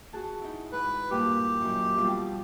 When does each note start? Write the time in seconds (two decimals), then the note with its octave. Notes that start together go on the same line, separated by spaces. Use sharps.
0.13 F#4 G#4 A5
0.41 D#4 E4
0.72 G#2 B4
1.11 G2 A#2 G4
1.61 F#2 D#3
1.98 B2 F3 G3